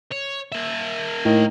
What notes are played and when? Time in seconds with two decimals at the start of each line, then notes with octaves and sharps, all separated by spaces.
0.11 C#5
0.52 A#3 E5
1.25 A2 D#3